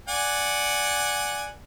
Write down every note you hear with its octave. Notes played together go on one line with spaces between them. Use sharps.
D5 F#5 G#5